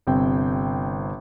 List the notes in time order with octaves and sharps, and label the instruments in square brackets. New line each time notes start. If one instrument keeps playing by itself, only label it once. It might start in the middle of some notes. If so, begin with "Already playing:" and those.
[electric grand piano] G1 C3 C4 G5